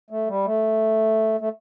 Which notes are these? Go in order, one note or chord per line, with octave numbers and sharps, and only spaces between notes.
A3
G3
A3
A3